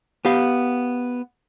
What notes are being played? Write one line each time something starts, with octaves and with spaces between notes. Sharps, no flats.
B3 G4 F5